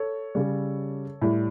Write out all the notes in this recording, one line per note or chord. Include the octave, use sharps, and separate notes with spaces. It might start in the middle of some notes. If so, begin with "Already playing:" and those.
Already playing: A4 C#5
C#3 G3
A2 G3